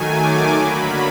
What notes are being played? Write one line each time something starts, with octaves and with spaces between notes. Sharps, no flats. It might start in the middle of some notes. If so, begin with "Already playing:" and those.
Already playing: D#3 F#3 A3 G#5
D6
D3 F#3 A#3 B5